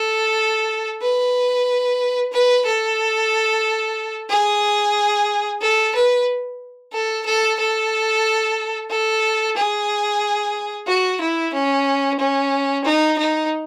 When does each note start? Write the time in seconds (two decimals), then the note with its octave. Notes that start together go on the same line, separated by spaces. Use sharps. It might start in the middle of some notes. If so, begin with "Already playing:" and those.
Already playing: A4
1.01 B4
2.32 B4
2.65 A4
4.29 G#4
5.61 A4
5.93 B4
6.92 A4
7.25 A4
7.58 A4
8.89 A4
9.55 G#4
10.86 F#4
11.19 E4
11.52 C#4
12.18 C#4
12.83 D#4
13.17 D#4